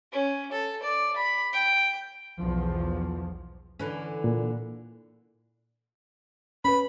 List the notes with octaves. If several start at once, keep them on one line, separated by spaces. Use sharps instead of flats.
C#4
A4
D5
B5
G5
B1 E2 F3
D3 E3 C#4
A#2
C#4 B4 B5